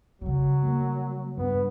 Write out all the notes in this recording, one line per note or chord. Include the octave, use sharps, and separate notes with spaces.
C#3 F#3 G3
A#3
G2 B3